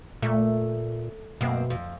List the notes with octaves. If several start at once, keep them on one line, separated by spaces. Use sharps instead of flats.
A#2 A3
F#2 B2 A#3 C4
F2